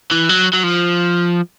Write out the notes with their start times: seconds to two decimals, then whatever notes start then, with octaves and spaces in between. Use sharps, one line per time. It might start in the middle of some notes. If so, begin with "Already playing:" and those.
0.11 E3
0.29 F#3
0.53 F#3
0.64 F3